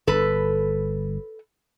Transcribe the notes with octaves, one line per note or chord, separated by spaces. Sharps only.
G1 A4 B4